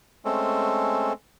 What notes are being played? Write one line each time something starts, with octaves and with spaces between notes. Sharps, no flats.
G#3 A3 C4 C#4 A4